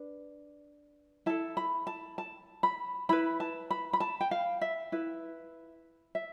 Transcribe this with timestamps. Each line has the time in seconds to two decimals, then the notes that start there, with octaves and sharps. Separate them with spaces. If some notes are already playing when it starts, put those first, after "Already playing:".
Already playing: D4 B4
1.26 E4 A4 A5
1.57 B5
1.87 A5
2.18 A5
2.63 B5
3.09 E4 B4 B5
3.40 A5
3.71 B5
3.93 B5
4.00 A5
4.21 G5
4.31 F5
4.61 E5
4.92 E4 B4
6.15 E5